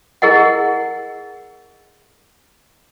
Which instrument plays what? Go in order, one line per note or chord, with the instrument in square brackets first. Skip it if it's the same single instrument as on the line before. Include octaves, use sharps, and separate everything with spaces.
[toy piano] E4 G#4 A#4 D#5 F#5